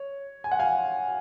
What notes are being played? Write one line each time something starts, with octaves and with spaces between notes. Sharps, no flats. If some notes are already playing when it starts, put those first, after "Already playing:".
Already playing: C#5
G#5
F#5
F5 G#5